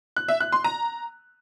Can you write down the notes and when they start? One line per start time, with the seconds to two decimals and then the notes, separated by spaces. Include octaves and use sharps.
0.16 F#6
0.28 E5
0.40 F#6
0.52 C6
0.64 A#5